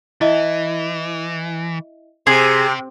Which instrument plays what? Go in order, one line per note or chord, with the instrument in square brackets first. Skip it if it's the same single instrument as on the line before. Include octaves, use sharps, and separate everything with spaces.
[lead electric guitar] E3 [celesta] E4 D#5 E5
[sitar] C3 [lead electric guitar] G4 C5 [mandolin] G#4